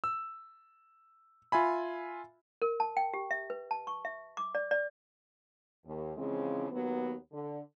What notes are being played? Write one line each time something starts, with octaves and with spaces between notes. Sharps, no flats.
E6
F4 E5 G#5 B5
A#4
A5
G5
G4
E5
B4
A5
C#6
E5
D6
D5
D5
D#2
C#3 E3 F3 G#3 C4
D#2 F#3 B3
D3